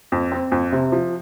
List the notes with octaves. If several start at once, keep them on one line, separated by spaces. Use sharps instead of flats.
F2
C4
F2
C3
F3